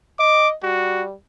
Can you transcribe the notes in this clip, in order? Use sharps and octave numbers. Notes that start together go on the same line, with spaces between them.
D#5 D6
G3 F#4